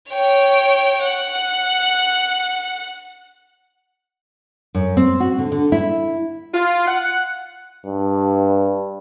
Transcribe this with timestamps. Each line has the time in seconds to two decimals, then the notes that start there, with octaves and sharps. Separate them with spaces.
0.11 C#5 G5
1.04 F#5
4.75 F#2
4.97 C4
5.20 F#4
5.39 D3
5.52 D3
5.72 E4
6.54 F4
6.88 F#5
7.86 G2